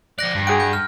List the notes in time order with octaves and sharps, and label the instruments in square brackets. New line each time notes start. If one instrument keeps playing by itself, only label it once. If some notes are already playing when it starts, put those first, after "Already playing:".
[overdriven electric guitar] F3 D5 [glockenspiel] F#6 A#6
[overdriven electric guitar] G2
[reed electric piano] G#4 F#5 G5 [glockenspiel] D7
[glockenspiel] G6
F6